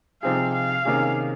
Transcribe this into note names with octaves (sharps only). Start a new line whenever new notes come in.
C3 F3 C4 D#4 G#4 F5
F5
C3 D#3 A#3 C#4 G#4